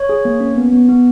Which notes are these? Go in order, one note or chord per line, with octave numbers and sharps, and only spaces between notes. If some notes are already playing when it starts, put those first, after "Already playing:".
Already playing: C#5
G#4
A#3
C#4
B3
B3
B3